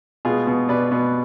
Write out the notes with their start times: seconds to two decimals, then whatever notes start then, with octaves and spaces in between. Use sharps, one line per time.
0.25 B2 F4 G#4
0.47 B2
0.69 B2 B4 D5
0.92 B2